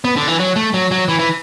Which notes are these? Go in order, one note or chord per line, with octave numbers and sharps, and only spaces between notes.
B3
D3
E3
F#3
A3
F#3
F#3
E3
E3